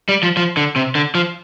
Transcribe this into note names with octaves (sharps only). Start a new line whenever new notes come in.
G3
F3
F3
D3
C3
D3
F3